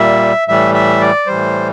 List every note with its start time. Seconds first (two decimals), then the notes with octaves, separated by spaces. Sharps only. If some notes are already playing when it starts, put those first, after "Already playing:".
Already playing: A#2 G3 E5
0.48 A2 E3 G3 E5
0.74 E5
1.01 D5
1.27 A2 E3 G3 C5